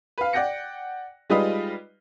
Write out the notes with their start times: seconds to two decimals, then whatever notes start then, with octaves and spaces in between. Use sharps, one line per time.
0.18 B4 F5
0.33 D5 F#5 G5 A#6 C#7
1.30 G3 G#3 D#4 F4 B4 D#5